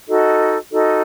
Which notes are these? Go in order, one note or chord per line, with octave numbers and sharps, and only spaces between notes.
D#4 F#4 A4 D#5
D#4 F#4 A4 D#5